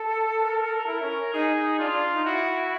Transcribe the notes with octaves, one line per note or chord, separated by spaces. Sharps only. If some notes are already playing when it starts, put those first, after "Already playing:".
Already playing: A4
A#4
E4
C#4
D#4 G#4
D#4
D4 F4
D4
D#4
E4 F#4